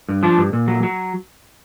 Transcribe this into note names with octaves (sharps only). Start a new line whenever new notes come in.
G2
F3 D4
G2
A#2
F#3
F#3